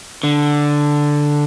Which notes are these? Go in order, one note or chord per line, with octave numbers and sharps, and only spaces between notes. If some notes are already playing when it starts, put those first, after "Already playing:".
D3